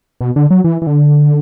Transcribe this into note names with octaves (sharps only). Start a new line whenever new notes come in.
B2
D3
F#3
E3
E3
D3